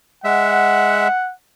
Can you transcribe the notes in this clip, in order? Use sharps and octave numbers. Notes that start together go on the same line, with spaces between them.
G#3 E5 F#5